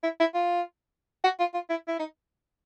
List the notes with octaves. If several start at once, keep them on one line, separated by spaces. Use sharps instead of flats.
E4
E4
F4
F#4
F4
F4
E4
E4
D#4